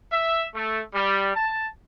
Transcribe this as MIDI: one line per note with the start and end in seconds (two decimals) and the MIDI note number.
0.11 0.45 76
0.54 0.82 57
0.94 1.31 55
1.35 1.68 81